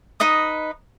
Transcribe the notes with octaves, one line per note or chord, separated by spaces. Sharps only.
D#4 B4 D#5 D#6